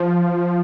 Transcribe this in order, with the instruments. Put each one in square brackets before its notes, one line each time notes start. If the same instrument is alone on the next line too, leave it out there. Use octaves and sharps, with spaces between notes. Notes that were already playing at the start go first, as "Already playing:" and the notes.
Already playing: [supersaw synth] F3